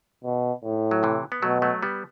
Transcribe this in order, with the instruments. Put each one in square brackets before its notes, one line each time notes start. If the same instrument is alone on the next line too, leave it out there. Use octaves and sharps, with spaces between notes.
[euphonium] B2
A2
[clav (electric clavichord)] F#3
C3 E3
B3
[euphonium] B2 [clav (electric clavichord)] F#3 A3
[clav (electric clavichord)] F#3 A3
G3 B3